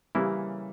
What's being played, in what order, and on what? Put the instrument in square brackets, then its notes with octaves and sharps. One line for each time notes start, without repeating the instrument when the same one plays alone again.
[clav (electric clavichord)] C#3 E3 A#3 E4 [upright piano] G3